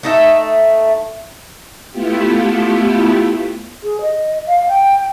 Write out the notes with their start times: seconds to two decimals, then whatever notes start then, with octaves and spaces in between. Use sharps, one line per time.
0.03 A3 D#4 E5
1.91 A3 B3 E4 F4 G4
3.83 G#4
4.01 D#5
4.47 F5
4.68 G5